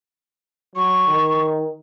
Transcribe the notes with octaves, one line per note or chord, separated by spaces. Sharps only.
F#3 C#6
D#3